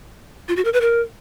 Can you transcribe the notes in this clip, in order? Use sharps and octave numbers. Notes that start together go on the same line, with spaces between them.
F4
F#4
A#4
B4
A#4